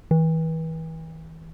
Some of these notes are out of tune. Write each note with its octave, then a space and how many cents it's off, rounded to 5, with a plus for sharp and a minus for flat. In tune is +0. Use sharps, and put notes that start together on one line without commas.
E3 -35